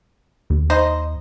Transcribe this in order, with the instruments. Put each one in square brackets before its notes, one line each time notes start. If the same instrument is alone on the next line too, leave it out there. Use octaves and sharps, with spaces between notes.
[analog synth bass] D#2
[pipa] D#4 C5 D#5